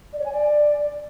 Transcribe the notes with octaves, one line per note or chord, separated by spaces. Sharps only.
D5
C#5
G#5
D5